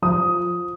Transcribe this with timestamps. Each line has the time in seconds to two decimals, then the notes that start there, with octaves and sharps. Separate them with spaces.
0.02 F3 D#6